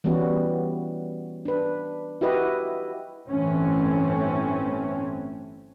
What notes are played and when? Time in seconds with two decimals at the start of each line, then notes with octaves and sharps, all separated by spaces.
0.04 E3 G3 B3 C#4 F#4
1.45 D4 B4
2.21 E4 F#4 G4 B4 D#5
3.28 G1 A2 E3 A3 C4 C#4